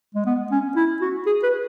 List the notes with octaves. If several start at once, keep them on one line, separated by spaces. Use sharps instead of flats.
G#3
B3
C#4
E4
F#4
G#4
B4